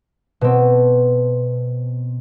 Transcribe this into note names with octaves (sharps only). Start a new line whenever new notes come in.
B2 C4